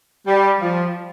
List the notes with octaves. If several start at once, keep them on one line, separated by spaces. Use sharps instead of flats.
G3
F3